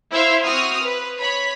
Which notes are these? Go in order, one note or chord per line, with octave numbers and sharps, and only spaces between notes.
E4 C5 E5 F5
C4 F#4 D#6 F6
B4
C#5 B5